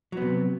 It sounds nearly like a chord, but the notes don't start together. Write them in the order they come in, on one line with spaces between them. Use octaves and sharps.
F#3 B3 C3